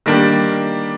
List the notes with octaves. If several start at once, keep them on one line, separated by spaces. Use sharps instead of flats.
D#3 G3 A#3 D4 G4